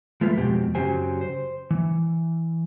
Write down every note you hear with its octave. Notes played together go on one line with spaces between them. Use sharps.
F3 G#3 A3 F4 B4
F2 B2 G#3 C4 G4
F#2 C#3 F#3 G4 C5 G#5
C5
E3